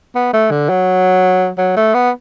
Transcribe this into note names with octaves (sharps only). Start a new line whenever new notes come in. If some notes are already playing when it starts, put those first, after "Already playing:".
B3
A3
D3
F#3
F#3
A3
B3